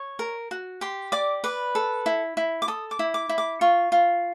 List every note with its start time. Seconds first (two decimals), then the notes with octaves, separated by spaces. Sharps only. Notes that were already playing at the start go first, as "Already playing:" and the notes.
Already playing: C#5
0.19 A#4
0.51 F#4
0.81 G4 C6
1.12 D5 D6
1.44 B4 D6
1.75 A4
2.06 E4
2.37 E4
2.62 D6
2.68 A4 D#6
2.91 D6
2.99 E4
3.14 D6
3.29 E4
3.38 D6
3.61 F4 C#6
3.92 F4